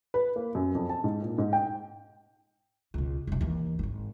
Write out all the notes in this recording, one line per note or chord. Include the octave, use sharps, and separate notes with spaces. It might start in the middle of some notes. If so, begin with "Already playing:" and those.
B4
A#3
F#2
F2
A5
G#2
A#2
G#2
G5
C#2 B2
F1 B1
D#2 E3
D#1 G#1